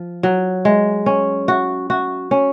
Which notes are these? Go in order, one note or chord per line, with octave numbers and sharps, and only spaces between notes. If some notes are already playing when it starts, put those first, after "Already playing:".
Already playing: F3
F#3
G#3
C#4
F#4
F#4
C#4